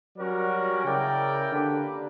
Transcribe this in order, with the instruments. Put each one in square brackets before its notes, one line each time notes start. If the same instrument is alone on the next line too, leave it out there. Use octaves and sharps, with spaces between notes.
[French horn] F#3 [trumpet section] G3 C#4 F#4 A#4 D5
[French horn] C#3 [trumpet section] E4 A#4 D5 G5
[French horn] D3 [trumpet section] A#3 D4 G4 B4 D5